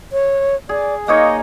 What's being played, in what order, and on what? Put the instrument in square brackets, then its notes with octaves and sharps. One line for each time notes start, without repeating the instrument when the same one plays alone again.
[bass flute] C#5
[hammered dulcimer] G#4 [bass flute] D5
[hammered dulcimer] A#3 D#4 C#5 [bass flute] D#5